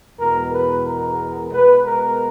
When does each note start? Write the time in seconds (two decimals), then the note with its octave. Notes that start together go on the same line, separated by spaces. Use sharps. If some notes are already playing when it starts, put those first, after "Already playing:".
0.18 E2 B2 G#3 B3 A#4
0.52 B4
0.84 A#4
1.50 B2 G#3 B3 B4
1.84 A#4